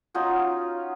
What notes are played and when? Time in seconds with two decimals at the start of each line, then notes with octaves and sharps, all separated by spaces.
0.14 C#4 D#4 F4 F#4